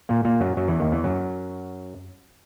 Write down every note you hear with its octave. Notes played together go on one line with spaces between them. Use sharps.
A#2 A#3
A#2 A#3
F#2 F#3
F#2 F#3
E2 E3
D#2 D#3
E2 E3
F#2 F#3